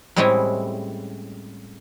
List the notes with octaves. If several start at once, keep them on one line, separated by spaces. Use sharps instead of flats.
A2 G3 G#3 C4 C#4 E4